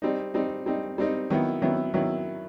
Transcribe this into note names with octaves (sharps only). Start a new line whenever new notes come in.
G3 C4 D#4
G3 C4 D#4
G3 C4 D#4
G3 C4 D#4
D#3 F#3 B3 E4
D#3 F#3 B3 E4
D#3 F#3 B3 E4